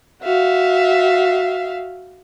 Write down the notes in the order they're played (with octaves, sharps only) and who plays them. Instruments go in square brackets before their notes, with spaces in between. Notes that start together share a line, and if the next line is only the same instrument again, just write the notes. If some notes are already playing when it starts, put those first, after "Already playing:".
[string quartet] F#4 E5 F5